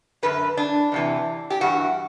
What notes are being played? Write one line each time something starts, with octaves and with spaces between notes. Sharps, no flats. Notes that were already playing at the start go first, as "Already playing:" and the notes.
F#2 D3 B4
D4
E2 C3 E3
G4
G2 E3 F#4